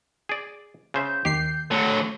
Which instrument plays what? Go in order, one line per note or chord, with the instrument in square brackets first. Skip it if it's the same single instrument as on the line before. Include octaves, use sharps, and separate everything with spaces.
[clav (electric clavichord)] G#4 D5
[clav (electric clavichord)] C#3 C5 E5 [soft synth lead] G6
[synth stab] D#2 D#3 C7 [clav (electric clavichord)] G4
[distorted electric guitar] D3 F#3 [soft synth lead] A3